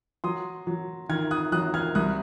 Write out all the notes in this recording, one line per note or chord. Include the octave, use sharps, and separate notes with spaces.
F#3 C6 D#6
F#3
D#3 F6 G#6
D#6 F#6
F#3 D#6 F#6
F6 G#6
C2 D#6 F#6